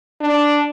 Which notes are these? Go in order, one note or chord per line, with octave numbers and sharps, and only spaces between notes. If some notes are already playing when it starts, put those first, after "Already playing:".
D4